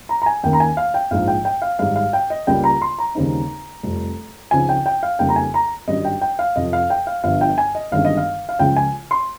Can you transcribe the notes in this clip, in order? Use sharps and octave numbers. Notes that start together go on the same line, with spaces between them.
A#5
A#5
G#5
D#2 D#3 A#3 C#4 G5
A#5
G#5
F5
G5
A#1 G#2 F3 F5
G5
G5
F5
G#1 G#2 G3 F5
F5
G5
D#5
C#2 C#3 G3 A#3 G5
A#5
C6
A#5
D#2 C#3 G3 C4 D#4
F1 F2 C3 G3
C#2 C#3 F3 C4 D#4 G#5
G5
G5
F5
F2 C#3 G3 A#3 D#4 G5
A#5
G#5
A#5
G#1 G2 G3 C#4 D#5
G5
G5
F5
F2 C3 F3 D#5
F5
G5
F5
G1 G2 F3 F5
G5
G#5
D#5
G1 G2 D#3 G#3 C#4 F5
D#5
F5
F5
C#2 C#3 F3 G#3 C#4 G5
G#5
C6